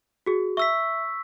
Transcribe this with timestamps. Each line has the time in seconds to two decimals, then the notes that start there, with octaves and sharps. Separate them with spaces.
0.26 F#4 G#4
0.57 E5 C#6 E6 B6